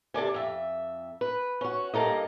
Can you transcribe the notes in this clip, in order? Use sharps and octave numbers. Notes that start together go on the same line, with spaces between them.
C3 A4 D5 G#5
F2 E5
B4
C#4 F#4
G2 A#3 A4 A#4 D#5